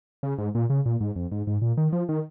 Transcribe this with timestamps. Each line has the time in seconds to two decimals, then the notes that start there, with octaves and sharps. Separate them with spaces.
0.23 C#3
0.38 G#2
0.55 A#2
0.70 C#3
0.86 A#2
1.01 G#2
1.16 F2
1.32 G#2
1.47 G#2
1.62 A#2
1.77 D#3
1.93 F3
2.09 D#3